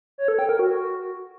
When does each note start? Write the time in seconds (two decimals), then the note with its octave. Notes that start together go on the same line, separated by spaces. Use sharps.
0.18 C#5
0.28 A4
0.39 G5
0.49 A#4
0.59 F#4